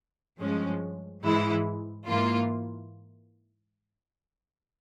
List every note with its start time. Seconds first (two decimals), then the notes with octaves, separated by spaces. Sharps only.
0.40 G2 F3 G#3 C#4
1.23 G#2 E3 G#3 E4
2.08 G#2 E3 A#3 F4